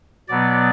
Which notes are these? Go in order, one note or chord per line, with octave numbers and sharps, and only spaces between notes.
B2 F#3 B3 D5